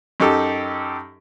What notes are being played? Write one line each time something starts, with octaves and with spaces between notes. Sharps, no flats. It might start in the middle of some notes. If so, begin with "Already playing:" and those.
F#2 D#4 G4 A4